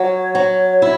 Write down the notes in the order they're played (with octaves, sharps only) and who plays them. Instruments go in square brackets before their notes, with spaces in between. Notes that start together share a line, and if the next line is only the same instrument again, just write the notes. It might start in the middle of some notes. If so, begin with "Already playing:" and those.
Already playing: [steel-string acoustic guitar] F#3 [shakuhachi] C#5
[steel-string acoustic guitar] F#3
E4